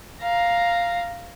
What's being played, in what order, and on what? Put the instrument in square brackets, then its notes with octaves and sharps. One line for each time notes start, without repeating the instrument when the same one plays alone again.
[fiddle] F5 A#5